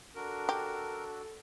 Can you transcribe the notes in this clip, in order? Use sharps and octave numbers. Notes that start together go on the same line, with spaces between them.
D4 F#4 A4 A#4
G4